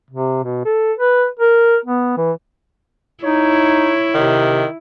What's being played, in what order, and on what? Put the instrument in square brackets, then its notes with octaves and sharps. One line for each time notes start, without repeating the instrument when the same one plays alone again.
[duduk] C3
B2
A4
B4
A#4
B3
E3
[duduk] D#4 [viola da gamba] E4 [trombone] C#5
[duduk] C3 [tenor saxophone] D#3